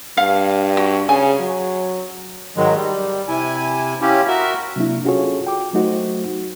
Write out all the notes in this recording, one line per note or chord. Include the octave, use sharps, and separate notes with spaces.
G2 F5
F#4
C#3 G#5
F#3
G#2 D#3 F#3 G#3
G3
C3 E4 G#5
C#4 E4 F4 G4
F#4 A#4 E5
C3 F#3 A#3 D4 E4
C#4 F4 F#4 G#4 A4 C#5
G5 D6
F#3 A3 D#4 F#4 C5